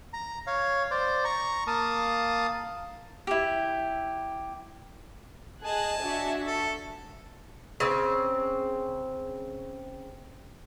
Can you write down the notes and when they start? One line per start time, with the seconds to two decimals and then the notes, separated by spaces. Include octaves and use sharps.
0.13 A#5
0.47 C#5 F5
0.91 C5 D5
1.25 A#5 C#6
1.67 A#3 F5 A5 D#6
3.27 E4 G4
5.63 G#4 D#5 G#5 A5 F#6
6.02 D4 F#4 E5
6.46 A4
7.80 C#3 C4